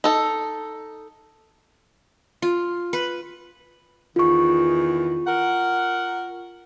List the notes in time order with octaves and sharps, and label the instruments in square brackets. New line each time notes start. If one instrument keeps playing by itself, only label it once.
[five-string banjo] D#4 A4
[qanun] F4
B4
[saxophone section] E2 D#3 [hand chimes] F4 C#6
[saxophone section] A#4 F#5